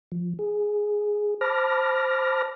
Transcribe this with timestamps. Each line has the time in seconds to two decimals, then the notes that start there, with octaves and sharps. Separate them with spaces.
0.12 F3
0.39 G#4
1.41 C5 A5 B5 D6 F6 A#6